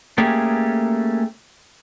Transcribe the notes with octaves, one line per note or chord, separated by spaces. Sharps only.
A3 A#3 C#4 G4 G#4